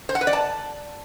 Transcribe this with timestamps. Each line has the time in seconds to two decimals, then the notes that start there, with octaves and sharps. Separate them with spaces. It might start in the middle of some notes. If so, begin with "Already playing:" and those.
0.09 C5
0.15 F#5
0.21 B4
0.27 D5
0.33 A5